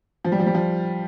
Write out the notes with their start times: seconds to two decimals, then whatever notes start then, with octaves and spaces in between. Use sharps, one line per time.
0.25 F3
0.32 G3
0.40 F3
0.46 G3
0.55 F3